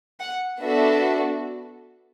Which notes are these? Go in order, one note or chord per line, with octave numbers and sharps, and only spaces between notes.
F#5
B3 D4 F#4 A4 E5